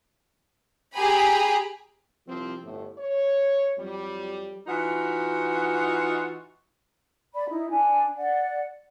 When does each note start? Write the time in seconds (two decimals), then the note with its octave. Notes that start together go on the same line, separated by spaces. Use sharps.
0.96 G4 G#4 G#5 A#5 B5
2.28 C2 F3 C4
2.63 G1 A2
2.99 C#5
3.78 F2 F#3 G3
4.67 E3 D#4 F4 F#4
7.34 D5 B5
7.49 D#4 E4
7.70 D4 G#5
8.16 D5 F#5